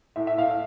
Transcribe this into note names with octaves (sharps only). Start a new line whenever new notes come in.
A2 E5
E5
A2 F5
E5